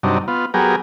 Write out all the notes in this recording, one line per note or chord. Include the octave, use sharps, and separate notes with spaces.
G2 C3 F#3 D4 D#4
B3 F4
F#3 B3 G4 G#4 A#4